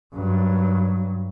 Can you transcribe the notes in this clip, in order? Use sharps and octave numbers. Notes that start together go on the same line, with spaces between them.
G2 F#3